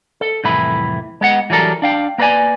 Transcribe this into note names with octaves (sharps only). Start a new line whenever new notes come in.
A4
C2 F2 A2 E3 E4 B5
G#3 B3 F#5
E3 F#3 G3 A4 A#4
D4 F5 G5
A#3 A#4 B4 D5 G#5